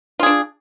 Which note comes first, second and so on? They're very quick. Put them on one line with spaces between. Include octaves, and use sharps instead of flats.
F4 G#4 D4